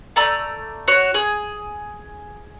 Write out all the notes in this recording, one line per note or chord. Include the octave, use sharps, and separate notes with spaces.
A3 D5 A#5 E6
F#4 C#5
G#4